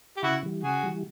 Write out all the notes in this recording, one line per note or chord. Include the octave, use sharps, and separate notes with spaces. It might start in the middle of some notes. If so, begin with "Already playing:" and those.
G4
C#3 E4 F#4
E3 G3
C#3 F#4 G#4
E3 G3